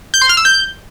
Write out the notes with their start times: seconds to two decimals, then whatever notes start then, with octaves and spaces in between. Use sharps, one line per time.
0.14 G6
0.22 C6
0.29 F6
0.37 E6
0.45 G6